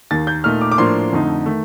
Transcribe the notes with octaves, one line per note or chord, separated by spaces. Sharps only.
D#2 D#3 A#3 A6
G6
A#2 A3 D#4 F6
D6
D6
A2 F3 A#3 D4 C6
F2 D3 A3 D#4
D#3 A3